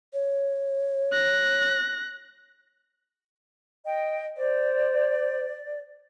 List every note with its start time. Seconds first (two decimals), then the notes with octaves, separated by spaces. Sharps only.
0.14 C#5
1.12 F#6 A#6
3.85 D#5 G5
4.37 C5 D5